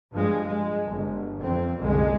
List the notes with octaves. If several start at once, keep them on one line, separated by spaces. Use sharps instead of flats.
G2 F3 G#3
G#3
G1
F2 C4
F#1 C2 D3 G#3